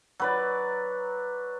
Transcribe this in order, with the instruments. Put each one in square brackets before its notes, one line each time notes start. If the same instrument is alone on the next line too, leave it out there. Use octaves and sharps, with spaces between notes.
[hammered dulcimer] F#3 B4 D5